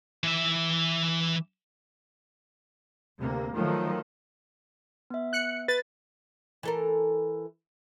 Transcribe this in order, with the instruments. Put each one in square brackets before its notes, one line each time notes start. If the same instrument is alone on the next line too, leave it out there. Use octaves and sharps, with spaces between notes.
[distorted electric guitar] E3 E5
[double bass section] D2 C3 A#3
D#3 F3 F#3 A3
[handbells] B3 E5
[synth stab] F#6 C#7
[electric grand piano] B4 [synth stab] A6
[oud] E3 A4 A#4